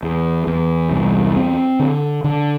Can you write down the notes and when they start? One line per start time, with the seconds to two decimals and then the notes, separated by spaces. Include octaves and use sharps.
0.03 E2
0.47 E2
0.91 C2
1.36 C4
1.79 D3
2.24 D3